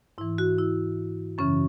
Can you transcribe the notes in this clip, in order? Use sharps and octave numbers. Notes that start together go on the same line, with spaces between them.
G#2 E3 E4
F#4
E4
F#2 C#3 E3 C#4